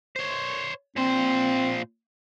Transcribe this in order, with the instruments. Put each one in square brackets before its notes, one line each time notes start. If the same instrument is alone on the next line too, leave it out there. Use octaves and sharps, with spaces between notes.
[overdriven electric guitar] C5 C#5
[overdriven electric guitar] A#2 C5 [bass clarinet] C4